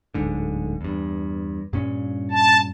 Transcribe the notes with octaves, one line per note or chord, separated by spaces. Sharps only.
D1 G#2 D3
E2 G2
G2 A#2 C#4
A5